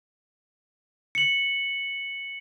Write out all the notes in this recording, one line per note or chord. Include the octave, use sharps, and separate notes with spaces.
C#7 F#7